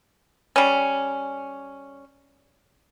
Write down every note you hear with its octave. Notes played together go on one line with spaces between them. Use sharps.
G3 C#4